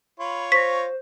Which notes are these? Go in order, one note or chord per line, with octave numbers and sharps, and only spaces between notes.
F4 C#5 B5
C5 C#6 A#6 B6